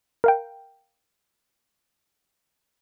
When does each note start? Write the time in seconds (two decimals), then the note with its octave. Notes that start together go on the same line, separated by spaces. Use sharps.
0.24 A#4 F5 G5